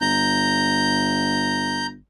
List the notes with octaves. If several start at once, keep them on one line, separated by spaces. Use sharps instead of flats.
G1 A#5 G6